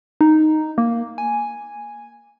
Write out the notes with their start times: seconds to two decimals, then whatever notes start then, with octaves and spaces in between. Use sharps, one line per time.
0.21 D#4
0.78 A#3
1.18 G#5